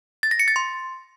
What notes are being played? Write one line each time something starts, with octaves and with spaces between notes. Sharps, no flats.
A6
A#6
C#7
A6
C6